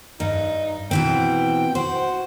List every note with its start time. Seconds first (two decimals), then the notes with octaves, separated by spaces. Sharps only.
0.20 G2 D#4
0.91 B2 E3 C4 G5
1.75 F#4 C5